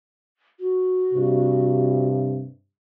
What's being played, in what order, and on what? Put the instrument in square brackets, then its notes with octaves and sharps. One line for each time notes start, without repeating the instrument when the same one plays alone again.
[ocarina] F#4
[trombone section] G2 C3